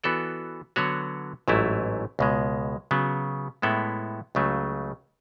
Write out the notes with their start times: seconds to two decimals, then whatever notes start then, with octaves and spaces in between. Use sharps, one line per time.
0.04 E3 B3 F#4 A4 D5
0.76 D3 F#3 B3 F#4 C#5
1.48 A1 G#2 F#3 A3 E4
2.19 C#2 B2 G#3
2.91 C#3 F#3 B3
3.62 A2 G#3 B3 E4 A4
4.35 C#2 C#3 F#3 A3